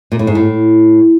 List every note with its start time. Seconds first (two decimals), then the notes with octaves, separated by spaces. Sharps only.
0.12 A#2
0.19 A2
0.27 G#2
0.35 A2